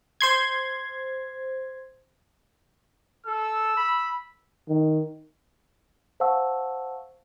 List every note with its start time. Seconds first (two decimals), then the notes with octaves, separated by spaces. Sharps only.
0.21 C5 C6 G#6
3.27 A4 E6
3.77 B5
4.69 D#3
6.20 C5 F5 F#5 A5 C#6 E6